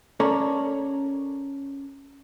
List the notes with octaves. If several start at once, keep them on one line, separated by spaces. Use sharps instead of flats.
C#4 A4 A#4 C#5 D5 A#5